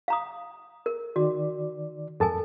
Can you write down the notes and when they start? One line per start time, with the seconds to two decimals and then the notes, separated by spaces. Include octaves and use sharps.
0.08 F5 A#5 D#6
0.86 A#4
1.16 D#3 F#4 D5
2.20 F2 G#2 A4 A#4 G#5 A5